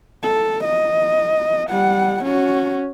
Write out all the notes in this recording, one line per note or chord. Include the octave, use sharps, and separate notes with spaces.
A4
D#5
G3 F#5
C#4 F#4